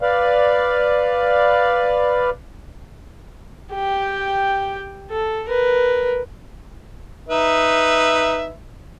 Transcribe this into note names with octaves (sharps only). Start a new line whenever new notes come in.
B4 D5 F5
G4 G5
A4
A#4 B4
D#4 B4 E5